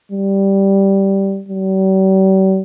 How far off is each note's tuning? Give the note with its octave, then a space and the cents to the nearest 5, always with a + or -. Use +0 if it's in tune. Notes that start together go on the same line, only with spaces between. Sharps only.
G3 -5
G3 -45